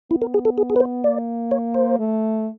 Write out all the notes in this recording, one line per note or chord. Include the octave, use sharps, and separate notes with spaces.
B3 E4
A#4
G#4
A4
G#4
G#4
B4
C5
A#3 D5
C#5
C5
A3